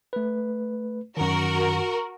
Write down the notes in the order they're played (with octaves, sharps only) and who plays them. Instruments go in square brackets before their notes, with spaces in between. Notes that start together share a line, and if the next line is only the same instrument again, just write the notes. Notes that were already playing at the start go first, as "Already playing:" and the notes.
[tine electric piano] A3 B4
[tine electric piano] F#2 D#3 [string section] F#4 A#4